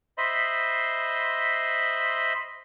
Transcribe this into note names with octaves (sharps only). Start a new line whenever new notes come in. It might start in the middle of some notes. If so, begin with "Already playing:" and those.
C5 D#5 E5 B5 C6